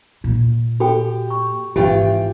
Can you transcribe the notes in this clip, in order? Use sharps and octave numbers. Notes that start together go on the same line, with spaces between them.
A#2
F#4 G4 A4 G5
C#6
G#1 E3 F4 G4 G5